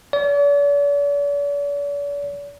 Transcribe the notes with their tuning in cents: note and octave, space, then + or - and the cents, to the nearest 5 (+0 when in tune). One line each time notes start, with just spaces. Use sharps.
D5 -45